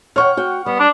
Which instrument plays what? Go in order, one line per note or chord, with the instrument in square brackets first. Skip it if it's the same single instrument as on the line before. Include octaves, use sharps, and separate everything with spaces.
[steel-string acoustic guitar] C#5 G5 [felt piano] F#5 C#6 F6
[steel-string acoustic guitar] F#4 G5
[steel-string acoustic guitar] G3 [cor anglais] B3
[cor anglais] D4